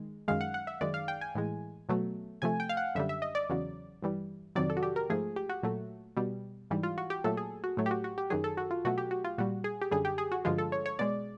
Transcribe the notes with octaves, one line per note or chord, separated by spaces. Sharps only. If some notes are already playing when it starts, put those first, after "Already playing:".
Already playing: D#3 G#3
F#2 D#3 G#3 F5
F#5
F#5
E5
F#2 D#3 G#3 D5
F5
G5
G#5
A2 E3 G#3
B2 F#3 A3
C3 F3 A3 G#5
G5
F5
F#5
F#2 D3 G3 E5
E5
D#5
D5
E2 C#3 F#3
G2 E3 G3
F2 C3 D#3 F#3 D5
A4
F#4
G4
A#4
G#2 F3 A3 G#4
G4
F#4
A#2 F#3 A3
B2 G3
G#2 E3 G3
F4
F#4
G4
A#2 F#3 A3 A4
G#4
F#4
A2 F#3 A3
G4
F#4
F#4
G4
F#2 D#3 F#3 G#4
A4
F#4
F4
B2 F#3 A3 F#4
G4
F#4
F4
A#2 G3 F#4
G#4
G4
F#2 D3 G3 G#4
G4
G#4
F#4
G2 D3 F3 G#3 F4
A4
C#5
C#5
B2 G#3 D5